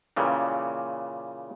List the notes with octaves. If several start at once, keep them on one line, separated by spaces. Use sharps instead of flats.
A#2 C#3 E3 G3